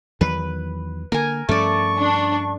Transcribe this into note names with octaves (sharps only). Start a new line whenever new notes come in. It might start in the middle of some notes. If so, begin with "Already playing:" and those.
E2 D#3 F#3 B4
D3 A#3 A#4 G#5
G2 F3 A3 C#4 D5 C#6
D4